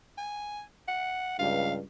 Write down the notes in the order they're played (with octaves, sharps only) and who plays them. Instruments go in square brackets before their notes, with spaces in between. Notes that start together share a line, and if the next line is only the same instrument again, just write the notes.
[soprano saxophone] G#5
F#5
[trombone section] C#2 G2 [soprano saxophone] F5